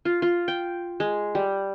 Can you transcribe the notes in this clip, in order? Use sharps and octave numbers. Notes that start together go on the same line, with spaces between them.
F4
F4
G5
G#3
G3